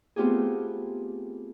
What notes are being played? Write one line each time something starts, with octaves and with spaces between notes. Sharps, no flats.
A3 B3 C4 F4 G4 G#4